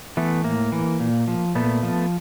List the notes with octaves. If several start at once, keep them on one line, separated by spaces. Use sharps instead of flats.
E3 A3 B3
A2 A#3
E3
A#2
F3
A#2 A3 B3
F3